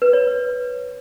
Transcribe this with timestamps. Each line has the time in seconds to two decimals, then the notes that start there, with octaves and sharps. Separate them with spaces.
0.02 B4
0.13 C#5